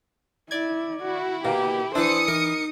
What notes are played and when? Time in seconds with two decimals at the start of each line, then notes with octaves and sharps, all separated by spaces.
0.51 E4 D5 G#6
1.04 E4 F#4
1.45 B2 A#3 G4
1.95 E3 D4 E4 C5 D#6 C#7
2.28 E3 D#4 A#4